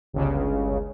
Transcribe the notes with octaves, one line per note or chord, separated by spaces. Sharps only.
G1 C#2 C#3